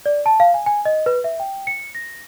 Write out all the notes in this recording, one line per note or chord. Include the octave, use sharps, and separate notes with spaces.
D5
A5
F5
G#5
G#5
D#5
B4
E5
G5
C#7
A#6